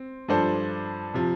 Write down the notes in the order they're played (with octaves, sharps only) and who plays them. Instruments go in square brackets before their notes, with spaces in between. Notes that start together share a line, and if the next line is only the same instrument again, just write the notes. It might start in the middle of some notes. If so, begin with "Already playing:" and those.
Already playing: [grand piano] C4
G2 F3 D4 A4 C5
C3 F3